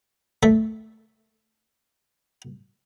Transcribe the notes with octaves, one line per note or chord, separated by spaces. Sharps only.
A3 E5